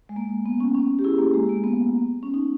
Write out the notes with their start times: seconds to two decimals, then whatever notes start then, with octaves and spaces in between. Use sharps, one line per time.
0.09 G#3
0.16 A#3
0.46 B3
0.60 C#4
0.74 C#4
0.99 G4
1.04 E4 G#4
1.19 A#3
1.34 G#3
1.49 A#3
1.64 B3
2.23 C#4
2.34 D#4